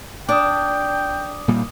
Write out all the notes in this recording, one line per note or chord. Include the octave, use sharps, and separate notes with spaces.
D4 G5 D6 D#6
A#2 G3 A#3